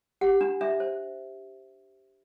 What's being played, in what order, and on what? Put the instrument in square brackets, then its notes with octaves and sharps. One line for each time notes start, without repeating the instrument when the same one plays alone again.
[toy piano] G4 F#5
D4
D4 E5
C5